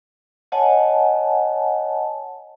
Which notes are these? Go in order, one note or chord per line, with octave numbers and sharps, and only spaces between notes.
C#5 D#5 F#5 G#5 A5